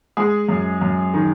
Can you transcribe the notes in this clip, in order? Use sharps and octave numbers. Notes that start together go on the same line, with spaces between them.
G#3 G#4
F#2
F#2
D#3